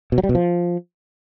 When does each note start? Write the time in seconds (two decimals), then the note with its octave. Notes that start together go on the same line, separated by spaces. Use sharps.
0.12 B2
0.18 F#3
0.23 G3
0.29 B2
0.35 F3